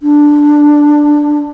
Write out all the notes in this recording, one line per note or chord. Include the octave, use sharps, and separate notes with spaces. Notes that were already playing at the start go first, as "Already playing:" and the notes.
D4